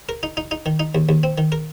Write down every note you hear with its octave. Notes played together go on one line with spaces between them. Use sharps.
A#4
D#4
D#4
D#4
D#3
D#4
D#2
D#2
C4
D#3
A#4